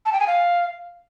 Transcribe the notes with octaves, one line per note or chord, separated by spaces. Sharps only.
A5
G5
G#5
F5